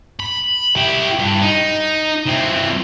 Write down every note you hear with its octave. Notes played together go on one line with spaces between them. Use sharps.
B5
E4 G4
G2
D#4
E3 C4